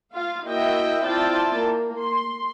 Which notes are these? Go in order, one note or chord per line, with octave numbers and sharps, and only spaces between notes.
F4 F5
A#3 E4 F#4 D#5 E5 G5
C4 E4 F4 D5 G5 A5
A#3
C6